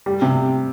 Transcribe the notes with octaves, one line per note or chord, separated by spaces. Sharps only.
G3
C3